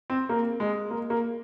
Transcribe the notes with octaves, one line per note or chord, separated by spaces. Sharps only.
C4
A#3
G#3
A#3
A#3